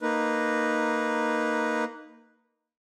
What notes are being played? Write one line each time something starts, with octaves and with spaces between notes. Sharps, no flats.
A#3 D#4 B4